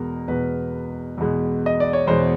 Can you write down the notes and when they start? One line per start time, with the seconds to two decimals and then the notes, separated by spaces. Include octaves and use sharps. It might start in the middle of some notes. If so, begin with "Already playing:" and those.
Already playing: E2 B2 G#3 A#4
0.28 E2 B2 G#3 B4
1.18 E2 B2 G#3
1.66 D#5
1.80 D5
1.93 C#5
2.07 E2 B2 G#3 C5